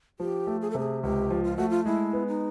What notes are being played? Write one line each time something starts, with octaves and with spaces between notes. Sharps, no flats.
F3 G4
A3
G#4
A4
C3 G#4
C#2 G4
F3
F4
A3 F#4
F4
G#3 E4
B3
D#4